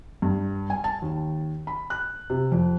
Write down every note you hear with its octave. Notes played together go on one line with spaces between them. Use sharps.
G2
G#5
A5
D#2
B5
F#6
C3
F2